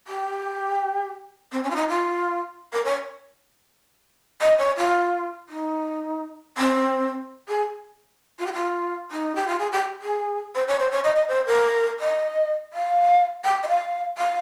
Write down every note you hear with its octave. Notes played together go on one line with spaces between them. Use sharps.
G4
C4
C#4
F4
D#4
F4
A#4
C#5
D#5
C#5
F4
D#4
C4
G#4
F4
G4
F4
D#4
G4
F4
G#4
G4
G#4
C5
C#5
C5
C#5
D#5
D#5
C5
A#4
D#5
F5
G5
D#5
F5
F5